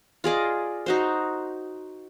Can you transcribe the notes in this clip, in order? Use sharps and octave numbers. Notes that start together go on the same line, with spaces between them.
F4 G#4 D5 D#5
D#4 F#4 C5